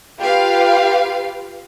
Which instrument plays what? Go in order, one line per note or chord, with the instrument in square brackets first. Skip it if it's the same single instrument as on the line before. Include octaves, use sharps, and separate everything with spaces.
[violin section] F4 G4 B4 F5